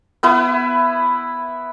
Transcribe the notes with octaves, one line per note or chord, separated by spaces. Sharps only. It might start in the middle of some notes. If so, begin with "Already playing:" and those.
B3 E4 B4